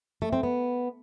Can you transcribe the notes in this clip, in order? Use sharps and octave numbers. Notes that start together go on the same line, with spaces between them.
A3
C4
B3